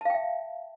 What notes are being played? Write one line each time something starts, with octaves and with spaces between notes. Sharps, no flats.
E5 F5 G5 A5